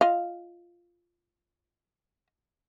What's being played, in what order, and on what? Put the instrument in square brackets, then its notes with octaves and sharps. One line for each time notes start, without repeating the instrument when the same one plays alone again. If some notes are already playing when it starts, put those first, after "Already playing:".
[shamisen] F4 D#5 F5